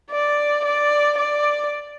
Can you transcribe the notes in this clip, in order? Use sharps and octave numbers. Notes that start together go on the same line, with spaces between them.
D5
D5
D5